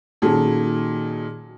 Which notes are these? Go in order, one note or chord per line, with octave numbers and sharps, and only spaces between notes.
A#2 D#3 F#3 C#4 G#4 A4